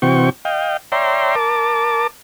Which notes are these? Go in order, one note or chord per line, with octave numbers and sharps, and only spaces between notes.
C3 E3 C4 F#4 G5 C#6
D#5 F5 G5
C#5 D5 E5 G5 A#5 C6
A#4 A5 D6